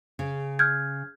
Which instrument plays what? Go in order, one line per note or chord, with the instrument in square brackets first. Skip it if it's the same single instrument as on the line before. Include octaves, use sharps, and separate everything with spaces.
[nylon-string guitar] C#3
[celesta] F6 G6 G#6